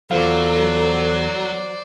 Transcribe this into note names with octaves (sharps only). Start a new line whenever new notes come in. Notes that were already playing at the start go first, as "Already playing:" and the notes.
E2 F#3 F4 A4 C5 D5 F5